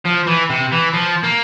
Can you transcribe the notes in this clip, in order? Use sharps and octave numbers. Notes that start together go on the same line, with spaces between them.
F3
E3
C3
E3
F3
A#3